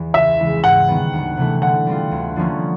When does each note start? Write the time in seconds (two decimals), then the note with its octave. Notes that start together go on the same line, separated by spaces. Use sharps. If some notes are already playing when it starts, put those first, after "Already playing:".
Already playing: E2 E3 G#3
0.14 C#2 E5
0.39 C#3 E3 G#3
0.64 G#2 F#5
0.88 D#3 G3 B3
1.13 D2
1.37 C3 E3 A3
1.62 D3 F#5
1.87 G3 C4 F4
2.11 D2
2.36 D3 F3 A#3 C#4